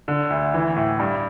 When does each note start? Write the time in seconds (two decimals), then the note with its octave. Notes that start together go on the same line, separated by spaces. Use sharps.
0.08 D3
0.30 D2
0.54 E3
0.76 A2
0.99 G2